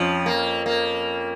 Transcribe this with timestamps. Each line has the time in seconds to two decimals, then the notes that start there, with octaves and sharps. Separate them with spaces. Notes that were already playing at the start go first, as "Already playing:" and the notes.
Already playing: F2 F3 C#4
0.26 A#3
0.66 A#3